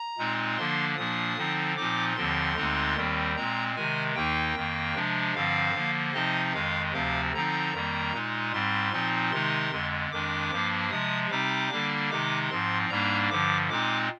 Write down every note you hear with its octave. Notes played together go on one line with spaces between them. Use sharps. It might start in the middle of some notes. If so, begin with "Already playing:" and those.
Already playing: A#5
A#2 G#3 C4 D#4
D3 F3 A#3 D4 C6
A#2 F3 A#3 D4 D#6
D3 F3 C4 D#4
A#2 F3 C4 D#4 D6
D#2 D3 F3 C4 C6
D2 D3 G#3 C4 D#4
D#2 D#3 G3 C4
A#2 G#3 C4 A#5
C3 D#3 G#3 G#5
D#2 D#3 A#3 D#4 G5
F2 D#3 A#3
C3 F3 G#3 D4
G2 D3 F3 C4 F5
D3 F3 A#3
C3 F3 C4 D#4 D#5
F2 D#3 G#3 F5
D2 C3 F3 C4 F5
D3 F3 C4 D#4 A#5
F2 D#3 G3 A#3
A#2 G#3 D#4
G#2 G3 C4 C6
A#2 F3 C4 D#4
C3 D#3 G#3 D#4 C6
F2 D3 G#3
F2 D#3 G#3 D4 D6
G2 F3 A#3 D4
C3 F3 G#3 D#6
C3 G3 C4 D#4 D6
D3 G3 A#3 D4
C3 D#3 G#3 D#4 D6
G#2 F3 C4 C6
G#2 G3 A#3 D4 A#5
G2 D3 F3 D6
A#2 G#3 C4 D#4 D6